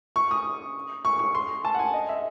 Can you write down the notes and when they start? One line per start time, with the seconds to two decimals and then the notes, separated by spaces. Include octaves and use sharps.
0.16 C#6
0.31 D#6
1.05 C#6
1.19 C#6
1.35 C6
1.65 A5
1.75 F#5
1.79 G#5
1.94 D#5
2.09 E5